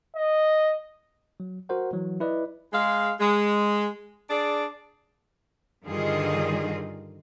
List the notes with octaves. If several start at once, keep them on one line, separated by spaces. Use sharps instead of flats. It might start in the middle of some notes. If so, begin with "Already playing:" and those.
D#5
F#3
F#4 A#4 C5 F#5
E3 F#3
E4 B4 D5 D#5
G#3 F5
G#3
D4 G#4 D5
G2 D3 D#3 F4 G#4 D#5